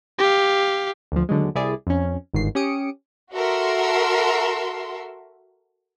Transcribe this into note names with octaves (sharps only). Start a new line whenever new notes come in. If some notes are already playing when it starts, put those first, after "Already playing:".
G4 F5
D2 F3
D#2 D3 F#3 G#3
C2 E4 G#4 D5
F2 C#4
G1 G#2 D#3 C7
C#4 G4 D#6 C#7 D7
F#4 A4 A#4 E5 C6